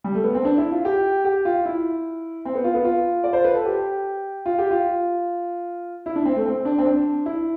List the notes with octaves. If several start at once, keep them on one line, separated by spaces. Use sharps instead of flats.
G3
A3
B3
C4
D4
E4
F4
G4
G4
F4
E4
C4
B3
F4
B3
F4
D5
C5
B4
A4
G4
F4
G4
F4
E4
D4
C4
A3
C4
D4
C4
D4
E4